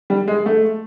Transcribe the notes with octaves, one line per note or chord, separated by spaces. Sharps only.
G3
G#3
A3